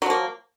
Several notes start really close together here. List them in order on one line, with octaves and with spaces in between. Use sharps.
F#3 F3 A#3